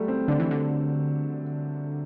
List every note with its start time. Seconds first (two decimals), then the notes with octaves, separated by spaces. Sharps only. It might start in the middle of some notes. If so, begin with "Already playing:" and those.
Already playing: F#3 G3 A3
0.08 C4
0.28 D3 D4
0.40 E3
0.51 D3